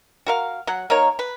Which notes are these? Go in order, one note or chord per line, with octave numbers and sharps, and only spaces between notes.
F#4 A#4 F5
F#3 F#5
A#3 D#4 A#4 C#5
B4